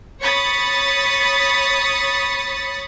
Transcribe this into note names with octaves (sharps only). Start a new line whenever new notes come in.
C#5 B5 D#6 A6 C#7